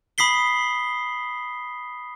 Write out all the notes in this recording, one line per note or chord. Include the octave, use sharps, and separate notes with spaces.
B5 D#6 B6 C7 G7